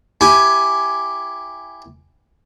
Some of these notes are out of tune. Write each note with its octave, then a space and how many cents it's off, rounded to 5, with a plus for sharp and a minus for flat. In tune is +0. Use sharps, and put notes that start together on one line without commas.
E4 +0 G4 +0 G#5 +10